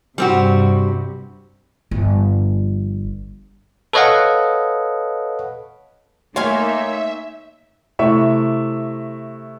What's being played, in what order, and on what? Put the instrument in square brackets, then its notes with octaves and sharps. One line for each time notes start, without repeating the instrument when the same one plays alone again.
[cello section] G2 C3 [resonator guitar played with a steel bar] G3 C4 F#4
[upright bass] G1 F3
[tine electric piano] A4 B4 C#5 D#5 F5 F#5
[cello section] A3 A#3 D#4 [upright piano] C#5 [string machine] E5 [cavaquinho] F5 G#5 C6
[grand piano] C3 A3 E4 E5 C#6